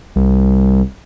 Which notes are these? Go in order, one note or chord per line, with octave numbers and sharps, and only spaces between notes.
C2